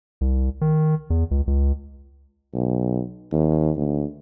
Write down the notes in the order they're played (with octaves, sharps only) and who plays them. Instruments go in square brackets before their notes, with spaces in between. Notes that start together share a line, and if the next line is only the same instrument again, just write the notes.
[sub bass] C2
D#3
E2
C#2
C#2
[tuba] B1
D#2
D2